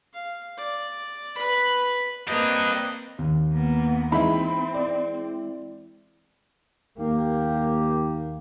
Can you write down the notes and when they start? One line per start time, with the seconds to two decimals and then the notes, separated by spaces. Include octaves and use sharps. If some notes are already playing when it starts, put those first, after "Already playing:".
0.13 F5
0.57 D5
1.36 B4 B5
2.28 A#3 C4 D4 G4 B4 D#5
3.19 D#2
3.53 A#3 B3
4.12 E3 G#3 C4 D#4 E4 B5
4.74 D5
6.99 D#2 A#3 G4